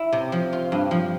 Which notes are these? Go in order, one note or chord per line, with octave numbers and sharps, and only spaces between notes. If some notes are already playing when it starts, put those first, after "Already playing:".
Already playing: E4
C3
F3
F4
G2
F3